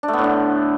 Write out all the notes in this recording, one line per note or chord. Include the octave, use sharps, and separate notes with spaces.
D4
A3
B3
A2
D3